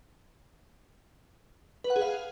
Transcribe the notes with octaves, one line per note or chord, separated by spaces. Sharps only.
B4
F#5
G#4
F5